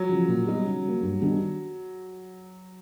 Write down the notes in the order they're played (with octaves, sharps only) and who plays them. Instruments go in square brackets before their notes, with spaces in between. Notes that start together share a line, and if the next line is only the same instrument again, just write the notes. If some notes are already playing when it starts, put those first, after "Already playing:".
Already playing: [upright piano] F#3
[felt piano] C#3 F3
A#2
G3 B3 D#4 F#4
C#3
F#3 A#3
G2
D#3 G3 B3 D4